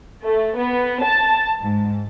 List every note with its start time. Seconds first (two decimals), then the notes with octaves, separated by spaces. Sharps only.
0.25 A3
0.59 B3
1.06 A5
1.61 G#2